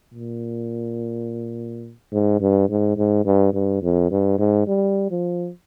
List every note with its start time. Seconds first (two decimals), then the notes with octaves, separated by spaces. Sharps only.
0.14 A#2
2.12 G#2
2.40 G2
2.69 G#2
2.97 G#2
3.25 G2
3.53 G2
3.82 F2
4.11 G2
4.39 G#2
4.67 G3
5.11 F3